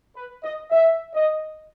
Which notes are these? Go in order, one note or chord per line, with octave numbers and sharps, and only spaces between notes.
B4
D#5
E5
D#5